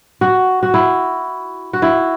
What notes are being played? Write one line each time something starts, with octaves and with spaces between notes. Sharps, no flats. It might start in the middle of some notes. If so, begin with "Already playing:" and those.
F#4
F#4
E4
F#4
E4